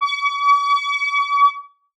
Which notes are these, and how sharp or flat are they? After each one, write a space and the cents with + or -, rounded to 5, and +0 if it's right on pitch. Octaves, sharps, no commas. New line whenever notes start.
C#6 +45